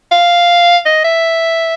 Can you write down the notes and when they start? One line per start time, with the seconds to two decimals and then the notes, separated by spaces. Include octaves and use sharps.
0.11 F5
0.86 D#5
1.04 E5